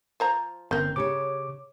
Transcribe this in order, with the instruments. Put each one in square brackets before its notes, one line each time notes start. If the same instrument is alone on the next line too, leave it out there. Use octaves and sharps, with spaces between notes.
[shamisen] F3 C5 A#5
[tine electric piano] G1 G6 [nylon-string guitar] C4 [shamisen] C#4 A#4
[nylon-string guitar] C#3 G4 C#5 [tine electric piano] D6